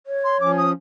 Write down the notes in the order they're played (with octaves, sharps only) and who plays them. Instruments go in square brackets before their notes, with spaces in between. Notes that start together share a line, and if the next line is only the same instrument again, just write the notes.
[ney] C#5
[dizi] C6
[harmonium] F3 C#4 [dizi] D6
[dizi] D#6